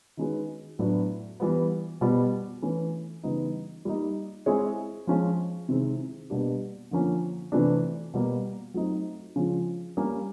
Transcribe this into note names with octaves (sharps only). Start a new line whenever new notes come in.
D#3 G#3 C#4 F#4 B4
A2 F#3 B3 D4
E3 G3 B3
B2 G3 B3
E3 A3 C#4
C#3 E3 G3 B3 D#4
G3 A#3 D#4
G#3 C4 E4 G#4 C#5
F3 G#3 C#4 F4
C3 D#3 G#3 C4 E4
B2 G3 A#3 D4 G4
D3 F3 A#3 C#4
C3 E3 A3 D4
B2 G3 A#3
F#3 A3 C4 D#4
C#3 F3 G#3 C#4 F4
G3 A#3 C#4